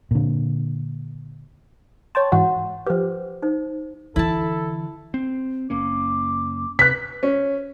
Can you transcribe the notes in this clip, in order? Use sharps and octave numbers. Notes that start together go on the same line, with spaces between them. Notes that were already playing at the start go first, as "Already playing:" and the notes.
A#2 D3
C#5 G5 A5 C6
G#2 E3 F#4 F#5
F3 G4 B4 C5
D#4 C5
D3 E3 E4 A4 A5
C4
F#1 A#3 C#4 D6
C3 B4 F#6 B6
C#4